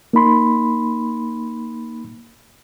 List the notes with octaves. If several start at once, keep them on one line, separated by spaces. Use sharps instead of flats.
A#3 D#4 B5 C6